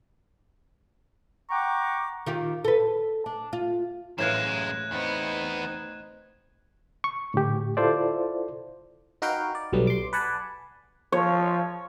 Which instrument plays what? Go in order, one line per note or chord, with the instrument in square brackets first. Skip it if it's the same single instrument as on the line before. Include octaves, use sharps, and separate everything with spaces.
[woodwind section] F#5 G5 A#5 C#6 D6
[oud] D#3 F4 G4
A4 B4
D4
F4
[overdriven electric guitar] F#2 G#3 [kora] A2 E3 F5 [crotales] F#6 G#6 E7
[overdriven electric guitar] E2 B3 [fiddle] C4 D#4
[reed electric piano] C#6
A2 D3 G4
E4 F4 A4 C5 D5
[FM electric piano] D#4 F#4 A#4 B4 F5 G5
D5
B1 F#3 G3 A3 B3
C6 D6
B4 D5 F#5 G#5 A5 B5
[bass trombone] F3 [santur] C#5